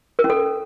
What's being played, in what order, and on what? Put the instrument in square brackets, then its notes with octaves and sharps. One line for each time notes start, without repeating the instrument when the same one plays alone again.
[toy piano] A#4
C#4
A4